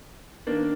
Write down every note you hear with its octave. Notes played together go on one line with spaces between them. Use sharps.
D#3 A#3 D4